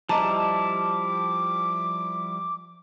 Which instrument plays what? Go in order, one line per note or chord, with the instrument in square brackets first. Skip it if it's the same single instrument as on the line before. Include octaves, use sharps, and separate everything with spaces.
[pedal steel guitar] F3 G3 E4 [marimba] D#5 A#5 [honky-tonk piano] A5 [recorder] D6